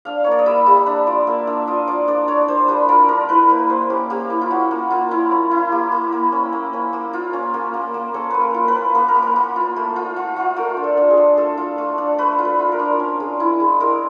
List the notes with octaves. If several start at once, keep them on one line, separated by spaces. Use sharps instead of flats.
D4 F5
A#3 C#5
D5
D#5
G3 E5
G3
D4 E5
F4 D5
A#3 E5
D4 E5
F4 D#5
F4 D5
D4 D5
D4 C#5
D4 C5
G3 B4
F4 A#4
D4 A#4
E4 B4
A#3 B4
A#3 C5
C#4 G4
A#3 G4
E4
F4
C#4 F#4
A#3
A#3 F4
E4
C#4
E4
A#3 G4
A#3
A#3
C#4
A#3
C#4
A#3
F4
C#4
A#3
A#3
A#3
C#4 A4
A#3 B4
A#4
F4
B4
A#3
A#3 B4
A#4
A#3
B4
A#3
F4
A3
F4
F4
F4
A3 A#4
D4
A4
D4
G#4
D4
A3 A4
F4
A3
D4
A3 B4
F4
B4
F4
A#4
D4
C#4
G#3
E4
G#3
G#3 A#4